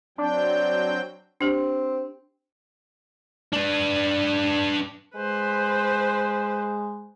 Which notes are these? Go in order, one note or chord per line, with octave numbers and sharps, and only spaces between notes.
F#3 C4 D4 G5
C4 D4 G4
D4 B4
G#3 B4 C5